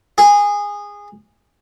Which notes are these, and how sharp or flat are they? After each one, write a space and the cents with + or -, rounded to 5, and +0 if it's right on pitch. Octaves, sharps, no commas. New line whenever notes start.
G#4 -20